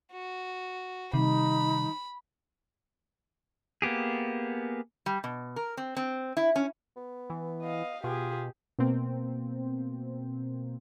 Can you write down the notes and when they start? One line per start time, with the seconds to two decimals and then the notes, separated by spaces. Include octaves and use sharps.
0.12 F#4
1.14 C3 D#3 G3 D#4 B5
3.82 A#3 B3 G4 G#4
5.06 G3
5.24 B2
5.56 A#4
5.77 C4
5.97 C4
6.37 E4
6.56 C#4
6.96 B3
7.30 E3
7.63 D#5 F5
8.04 B2 F4 G4 G#4
8.79 B2 A#3 C4